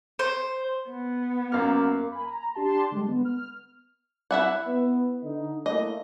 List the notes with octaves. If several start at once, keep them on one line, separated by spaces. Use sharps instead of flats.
C5
B3
F#2 A#3 F5 F6
G#5 B5
A#5
D4 G4 A5 C6
D3 G3 G#3
B3
F6
E4 E5 F#5
B3
D3 D#4
A3 A#3 E4 D#5